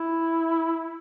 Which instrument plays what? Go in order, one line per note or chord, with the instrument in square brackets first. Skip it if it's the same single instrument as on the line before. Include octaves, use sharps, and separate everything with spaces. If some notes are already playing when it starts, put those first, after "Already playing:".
Already playing: [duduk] E4